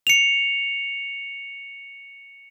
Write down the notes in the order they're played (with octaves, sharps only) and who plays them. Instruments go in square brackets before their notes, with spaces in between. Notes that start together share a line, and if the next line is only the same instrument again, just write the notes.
[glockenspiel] C#7 F7